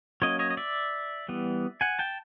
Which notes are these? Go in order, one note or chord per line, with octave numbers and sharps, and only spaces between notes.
F#3 A#3 C#4 C#5 D#5
C#5 D#5
D#5
D5 E5
E3 G3 B3
F#5 G#5
G5 A5